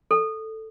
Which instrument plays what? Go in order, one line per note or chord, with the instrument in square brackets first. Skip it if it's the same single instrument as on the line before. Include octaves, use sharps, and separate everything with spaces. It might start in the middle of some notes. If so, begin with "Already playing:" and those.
[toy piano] A4